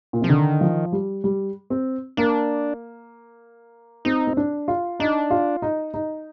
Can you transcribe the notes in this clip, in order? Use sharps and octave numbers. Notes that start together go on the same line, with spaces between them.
A#2
C3 F3
D3 D#3
F3
G3
G3
C4
A#3 D4
C4 D#4
C4
D4
F4
D4 D#4
F4
D#4
D#4